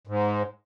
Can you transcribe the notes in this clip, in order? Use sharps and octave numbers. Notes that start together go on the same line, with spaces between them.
G#2